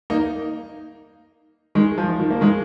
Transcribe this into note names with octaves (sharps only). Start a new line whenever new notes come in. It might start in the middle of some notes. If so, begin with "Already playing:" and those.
A#3 D#4
D#3 G#3
F3
D#3
A#3
D#3 G#3